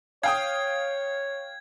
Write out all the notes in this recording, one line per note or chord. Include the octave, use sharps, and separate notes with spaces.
C#5 F5 G5 D#6 G#6